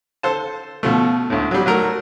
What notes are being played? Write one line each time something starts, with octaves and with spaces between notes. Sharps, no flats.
A4 C5 A5
B2 F3 A3
D2 A2
F#3 G3
F#3 A3 A#4